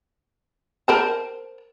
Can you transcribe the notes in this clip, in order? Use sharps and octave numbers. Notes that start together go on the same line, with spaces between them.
A#4 C5 A5